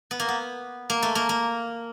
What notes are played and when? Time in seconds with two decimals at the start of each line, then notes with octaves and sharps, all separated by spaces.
0.11 B3
0.20 A#3
0.29 B3
0.90 A#3
1.03 A3
1.15 A#3
1.29 A#3